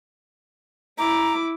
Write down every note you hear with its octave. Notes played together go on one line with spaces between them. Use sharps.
E4 A#5 D6